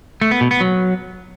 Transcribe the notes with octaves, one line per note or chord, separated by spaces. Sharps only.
A3
B3
B2
B3
F#3